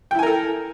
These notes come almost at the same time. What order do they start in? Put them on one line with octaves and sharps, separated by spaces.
G5 E4 G#5 A#4 A4